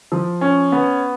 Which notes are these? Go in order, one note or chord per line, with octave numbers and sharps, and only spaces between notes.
F3
C#4
B3